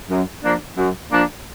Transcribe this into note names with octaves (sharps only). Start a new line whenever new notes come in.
F#2
F3 A#3 D4
F#2
F3 A#3 D4